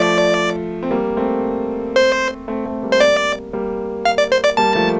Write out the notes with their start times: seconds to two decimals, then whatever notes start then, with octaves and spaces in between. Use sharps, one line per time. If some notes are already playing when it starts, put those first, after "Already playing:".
Already playing: F3 A3 D5
0.83 C4
0.91 G3 A#3
1.17 A3 C4
1.96 C5
2.48 A3 C4
2.65 A3 C4
2.83 G3 A#3
2.92 C5
3.00 D5
3.53 G3 A#3
4.05 F5
4.18 D5
4.32 C5
4.44 D5
4.57 G3 A#3 A5
4.75 F3 A3